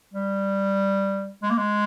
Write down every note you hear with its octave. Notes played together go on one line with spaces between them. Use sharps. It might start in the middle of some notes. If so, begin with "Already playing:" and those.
G3
G#3
A#3
G#3